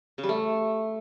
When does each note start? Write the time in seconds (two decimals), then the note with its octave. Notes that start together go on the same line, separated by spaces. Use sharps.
0.18 C#3
0.24 G3
0.29 A3